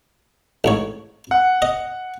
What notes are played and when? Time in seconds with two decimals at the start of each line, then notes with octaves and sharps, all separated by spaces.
0.64 A1 G#2 C#5
1.31 F#5
1.62 D#5